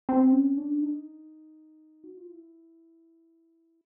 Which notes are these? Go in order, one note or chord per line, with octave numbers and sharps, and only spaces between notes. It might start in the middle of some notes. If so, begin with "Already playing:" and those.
C4
C#4
D4
D#4
F#4
F4
E4